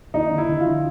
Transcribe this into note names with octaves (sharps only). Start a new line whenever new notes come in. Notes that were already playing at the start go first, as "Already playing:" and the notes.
D#2 D#4
D3
E4
D3
F4
D3